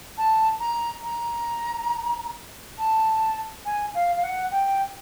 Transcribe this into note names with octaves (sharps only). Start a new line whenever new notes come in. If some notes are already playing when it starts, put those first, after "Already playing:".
A5
A#5
A#5
A5
G#5
F5
F5
F#5
G5